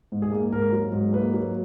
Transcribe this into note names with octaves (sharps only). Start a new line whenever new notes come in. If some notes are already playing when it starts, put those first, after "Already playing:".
G#2
G#4
A#3
G#2 A#4
F#3
G#2
A#3 B4
F#3